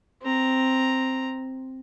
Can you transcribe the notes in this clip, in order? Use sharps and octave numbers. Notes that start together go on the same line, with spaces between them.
C4 A#5